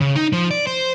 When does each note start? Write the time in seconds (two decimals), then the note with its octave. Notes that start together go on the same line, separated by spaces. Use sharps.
0.01 C#3
0.16 D#4
0.33 F3
0.51 D5
0.67 C5